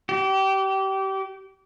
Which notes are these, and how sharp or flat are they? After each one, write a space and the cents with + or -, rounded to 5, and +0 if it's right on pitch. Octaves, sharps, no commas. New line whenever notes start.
G4 -25